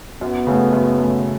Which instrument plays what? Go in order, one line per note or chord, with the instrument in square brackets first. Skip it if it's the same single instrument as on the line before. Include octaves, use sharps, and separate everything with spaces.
[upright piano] F#2 [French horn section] B3
[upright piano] C#3 A3
F#2
C#3 A3